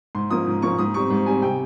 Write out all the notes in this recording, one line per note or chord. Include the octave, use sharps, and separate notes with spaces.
G#2 C6
F3 A#3 C#4 D#6
G#2
F3 A#3 C#4 C#6
G#2 D#6
G3 C4 C#6
G#2
G3 C4 G#5
C3 G5